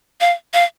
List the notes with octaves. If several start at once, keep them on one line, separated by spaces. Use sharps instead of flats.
F5
F5